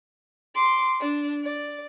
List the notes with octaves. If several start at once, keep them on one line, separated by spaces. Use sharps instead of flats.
C6 D6
D4
D5